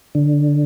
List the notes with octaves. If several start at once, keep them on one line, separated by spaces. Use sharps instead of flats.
D3